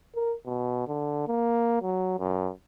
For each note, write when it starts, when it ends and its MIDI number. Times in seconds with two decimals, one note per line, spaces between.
0.15 0.34 70
0.46 0.84 47
0.87 1.25 50
1.27 1.79 58
1.82 2.17 54
2.19 2.50 42